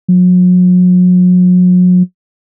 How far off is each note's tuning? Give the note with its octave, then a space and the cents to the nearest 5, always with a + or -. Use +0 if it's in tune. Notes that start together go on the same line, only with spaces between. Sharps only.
F#3 -40